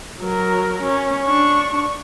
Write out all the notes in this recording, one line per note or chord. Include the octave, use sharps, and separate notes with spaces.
F#3 A#4
C#4
D4 C#6